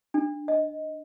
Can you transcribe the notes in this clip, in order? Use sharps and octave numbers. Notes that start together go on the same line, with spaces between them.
D4
D#5